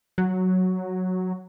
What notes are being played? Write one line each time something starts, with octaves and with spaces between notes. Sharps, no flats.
F#3